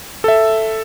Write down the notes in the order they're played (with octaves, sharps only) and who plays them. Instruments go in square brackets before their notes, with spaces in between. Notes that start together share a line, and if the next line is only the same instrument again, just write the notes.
[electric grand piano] A4 E5